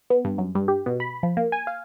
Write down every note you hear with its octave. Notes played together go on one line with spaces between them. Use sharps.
B3
G2
F#2
G2
G4
B2
B5
F3
A#3
G#5
F5